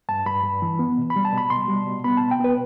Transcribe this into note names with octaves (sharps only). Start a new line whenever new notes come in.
G2 A5
G2 B5
G2
E3
B3
B2
B5
G3
A5
B2
B5
B2 C6
G3
B2
B3 B5
A5
B2
G5
B3 B4